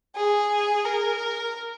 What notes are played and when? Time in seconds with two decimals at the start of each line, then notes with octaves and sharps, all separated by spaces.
0.16 G#4
0.84 A#4